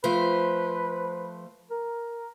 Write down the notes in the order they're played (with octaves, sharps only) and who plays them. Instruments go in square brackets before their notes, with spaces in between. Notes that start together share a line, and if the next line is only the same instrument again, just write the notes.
[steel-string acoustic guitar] F3 A3 C5 [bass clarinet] B4
[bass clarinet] A#4